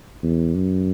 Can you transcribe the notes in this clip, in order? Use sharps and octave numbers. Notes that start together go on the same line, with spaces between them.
E2
F#2